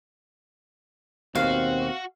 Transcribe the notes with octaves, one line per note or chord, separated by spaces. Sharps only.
D#2 B2 C4 F#4 F5